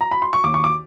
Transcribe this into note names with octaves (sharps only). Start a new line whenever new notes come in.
A#5
B5
C6
C#6
D#2 D6
C#6
D6